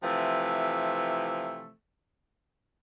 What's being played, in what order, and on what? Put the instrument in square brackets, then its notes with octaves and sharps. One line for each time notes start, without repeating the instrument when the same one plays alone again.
[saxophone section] C3 E3 F3 A3